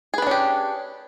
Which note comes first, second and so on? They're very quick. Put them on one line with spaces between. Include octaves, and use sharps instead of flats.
G#4 B4 D4 C#4 G4